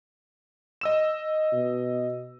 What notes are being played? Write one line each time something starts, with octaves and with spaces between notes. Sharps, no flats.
D#5 E6 E7
B2